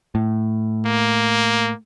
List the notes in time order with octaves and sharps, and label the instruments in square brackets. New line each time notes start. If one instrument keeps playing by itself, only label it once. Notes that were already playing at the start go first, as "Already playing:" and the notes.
[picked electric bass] A2
[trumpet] A#3